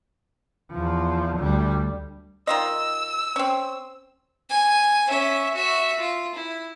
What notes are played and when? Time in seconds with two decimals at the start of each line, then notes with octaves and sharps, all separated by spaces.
0.72 E2 F3
1.38 D2 G3
2.47 D#3 F4 D#5 E6
3.36 C4 C#4
4.50 G#5
5.07 C#4 E5
5.54 F#4 E5
5.99 F4
6.35 E4